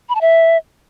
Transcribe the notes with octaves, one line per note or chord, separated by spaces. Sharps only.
B5
A5
E5